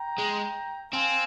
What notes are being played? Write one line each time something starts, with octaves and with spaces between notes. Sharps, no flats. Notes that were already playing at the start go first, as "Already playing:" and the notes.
Already playing: G5 A#5
G#3
C4 F5 G#5